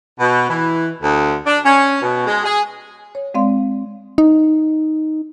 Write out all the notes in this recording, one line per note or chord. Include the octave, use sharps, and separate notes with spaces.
B2
E3
D2
D4
C#4
B2
G#3
G#4
C#5
G#3 C4 D5 F5 C6
D#4